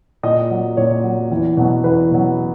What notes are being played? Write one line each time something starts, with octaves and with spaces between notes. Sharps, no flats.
A#2 D#5
F#3
A#2 C#5
F#3
E2
B2 F#3
E2 B4
B2 F#3